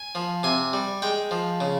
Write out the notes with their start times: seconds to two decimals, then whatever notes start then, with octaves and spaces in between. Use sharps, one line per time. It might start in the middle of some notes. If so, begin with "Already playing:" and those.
Already playing: G#5
0.15 F3
0.43 C3 G#5
0.73 G3
1.02 G#3 G5
1.31 F3
1.60 C#3